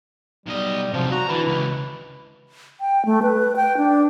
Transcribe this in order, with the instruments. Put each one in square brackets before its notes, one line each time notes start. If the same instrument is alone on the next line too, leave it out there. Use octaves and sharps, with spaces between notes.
[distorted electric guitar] B1 D#5 [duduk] G3
[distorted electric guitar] C3 F#3 [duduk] F3
[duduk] F#4 [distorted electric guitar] A#5
[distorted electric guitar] D3 [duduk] E3 [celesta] E4 B5
[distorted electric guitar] C#2 [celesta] B5
[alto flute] G5
A3
B4
G5
D4